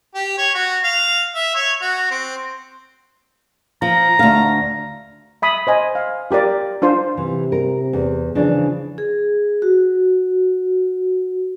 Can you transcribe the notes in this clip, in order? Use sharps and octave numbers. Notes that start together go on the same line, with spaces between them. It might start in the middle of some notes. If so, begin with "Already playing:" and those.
G4
C#5
F#4
F5
E5
C#5
F#4
C4
F3 A#5
D2 F5
E5 B5 D#6
C5 D#5 G#5
F5
F4 G4 A#4 D5
D4 F4 C5 C6
C3 E3
A#4
E2
C#3 E3 F3 D4
G#4
F#4